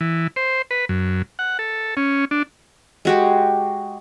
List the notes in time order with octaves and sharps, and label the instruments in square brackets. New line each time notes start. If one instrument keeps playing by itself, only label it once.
[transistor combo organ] E3
C5
B4
F#2
F#5
A4
C#4
D4
[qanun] G#3 F#4 G4